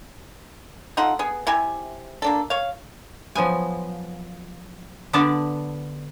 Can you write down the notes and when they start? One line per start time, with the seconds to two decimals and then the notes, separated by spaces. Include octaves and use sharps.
0.97 D#4 F4 A4 F#5
1.19 B3 G#4
1.47 C3 E4 G4 G#5
2.22 A#3 D4 A4
2.50 C#5 F5
3.35 F3 F#3 B3 G#5
5.13 D3 B3 D4 B4 D5 A5